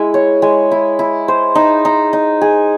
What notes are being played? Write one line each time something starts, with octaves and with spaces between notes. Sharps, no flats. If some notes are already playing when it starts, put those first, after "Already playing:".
Already playing: G#3 E4 D#5
C#5
G#3
E4
E4
C5
D#4
D#4
D#4
G#4